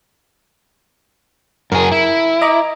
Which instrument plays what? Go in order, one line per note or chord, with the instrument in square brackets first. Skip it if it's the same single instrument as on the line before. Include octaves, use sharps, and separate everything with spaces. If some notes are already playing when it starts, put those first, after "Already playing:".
[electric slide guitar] F#2 G#4 [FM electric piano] A#4
[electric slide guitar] E4
[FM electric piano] D#5 A#5 D6